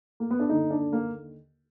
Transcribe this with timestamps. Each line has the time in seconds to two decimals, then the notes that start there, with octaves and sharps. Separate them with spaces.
0.20 A#3
0.30 B3
0.39 D4
0.49 D#2 D3 D#4
0.70 D4
0.93 A#3